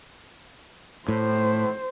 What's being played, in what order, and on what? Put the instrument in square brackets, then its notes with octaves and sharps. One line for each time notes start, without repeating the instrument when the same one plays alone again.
[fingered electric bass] A2 [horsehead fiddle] C5